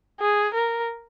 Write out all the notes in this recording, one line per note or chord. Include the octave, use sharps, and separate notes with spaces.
G#4
A#4